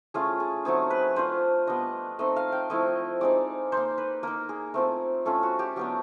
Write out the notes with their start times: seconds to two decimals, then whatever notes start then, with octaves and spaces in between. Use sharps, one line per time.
0.14 A3 C#4 F4 G#4
0.40 G#4
0.65 F#3 A3 C4 D#4 G#4
0.90 B4
1.16 A3 D4 F4 C5
1.67 G3 B3 D4 D#5
2.19 A3 C4 D#4 D#5
2.36 F5
2.52 G5
2.70 F3 A3 C4 E4 D#5
3.21 G#3 C4 D#4 D5
3.72 A#3 D#4 C5
3.98 B4
4.23 A#3 D#4 A#4
4.49 G#4
4.74 A3 C4 F4
5.25 A3 C#4 F4 A4
5.43 F#4
5.59 G4
5.76 F#3 B3 D4 G4